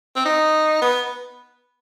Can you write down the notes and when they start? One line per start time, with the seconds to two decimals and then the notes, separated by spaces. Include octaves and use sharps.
0.16 C4
0.26 D#4
0.82 B3